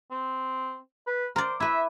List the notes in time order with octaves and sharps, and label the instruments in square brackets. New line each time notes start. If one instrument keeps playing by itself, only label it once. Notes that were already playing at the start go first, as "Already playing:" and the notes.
[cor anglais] C4
B4
[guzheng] A#4 D5 [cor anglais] C5
[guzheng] E4 B4 [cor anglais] E5